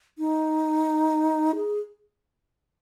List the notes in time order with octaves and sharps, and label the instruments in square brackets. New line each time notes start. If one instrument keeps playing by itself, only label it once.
[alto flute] D#4
G#4